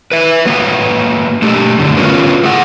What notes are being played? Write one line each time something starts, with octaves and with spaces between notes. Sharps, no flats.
B4 E5
F#3 A#3 B4
A3 D4 G4 A4
F#2 D3
B3 C#4 F4 F#4 A#4 B4
A3 G#4 F#5